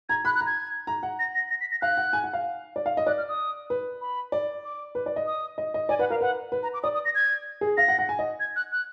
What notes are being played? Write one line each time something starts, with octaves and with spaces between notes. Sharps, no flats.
A#5 G#6
B5 F#6
F#6
A#5
G#6
A#5
F#5
A#6
A#6
A#6
B6
A#6
F5 F#6
F#5
G#5
F#5
F5
D5
F5
D#5
D5 F#6
F6
D#6
B4
B5
D5
D6
B4
D5
D#5
D#6
D#5
D#5
D5 G#5
B4 F#5
A#4 F5
B4 F#5
B4
A#5
D6
D5 D#6
D#6
A#6
G#6
G#4
F5 A#6
F#5
F#5
G#5
D#5
G#6
F#6
F#6